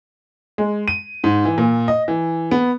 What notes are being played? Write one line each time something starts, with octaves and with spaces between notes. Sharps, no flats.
G#3
D#7
G#2
E3
A#2
D#5
E3
B3